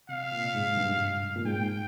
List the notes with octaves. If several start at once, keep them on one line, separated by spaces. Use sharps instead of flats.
C3 F5
A#2
G#2
G2
A#2
G#2 G5